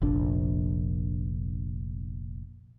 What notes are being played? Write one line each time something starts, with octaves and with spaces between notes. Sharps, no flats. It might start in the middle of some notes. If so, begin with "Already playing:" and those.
F1 A#1 D4